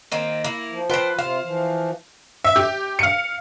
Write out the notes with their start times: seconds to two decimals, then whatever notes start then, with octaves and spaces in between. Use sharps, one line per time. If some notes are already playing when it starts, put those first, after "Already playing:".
0.12 D#3 A#3 C4
0.44 A#3 E4
0.71 F3
0.90 F4 B4 C5 G5
1.19 C3 F4 C5 F5
1.44 E3 F3
2.44 E5
2.56 G4
2.99 F5 C#7